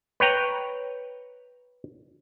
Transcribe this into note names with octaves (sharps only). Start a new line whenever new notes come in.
B4 C#5 G5 A#5